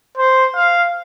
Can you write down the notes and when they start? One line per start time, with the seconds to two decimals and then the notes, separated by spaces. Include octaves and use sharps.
0.18 C5
0.56 F5